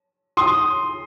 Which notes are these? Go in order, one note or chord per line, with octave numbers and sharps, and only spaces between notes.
C6 D#6